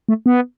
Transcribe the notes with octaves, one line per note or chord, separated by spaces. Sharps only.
A3
B3